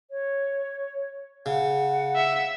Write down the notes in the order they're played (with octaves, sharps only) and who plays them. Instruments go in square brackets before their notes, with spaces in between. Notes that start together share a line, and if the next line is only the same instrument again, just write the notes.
[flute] C#5
[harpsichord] C#3 [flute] F#5
[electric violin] E5